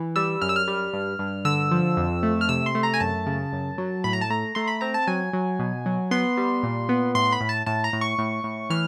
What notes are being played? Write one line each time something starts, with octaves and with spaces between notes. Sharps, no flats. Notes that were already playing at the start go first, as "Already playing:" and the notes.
Already playing: E3
G3 E6
F#2 F6
E6
F6
G3
G2
G2
D3 E6
F3
F2
A3
F6
C3 E6
C6
A3
A#5
G#5
F#2 A5
C#3
F#2
F#3
A2 B5
A#5
A5
A3 A#5
A3 C6
B5
C4 A#5
A5
F#3 G#5
F#3
B2
F#3
B3 C6
G3
A#2
B3
A2 C6
B5
A2
A5
A2 A5
A#5
A2
C#6
A2
A2
E3 F6